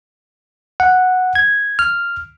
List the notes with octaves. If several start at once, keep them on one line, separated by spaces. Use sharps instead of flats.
F#5
G#6
F6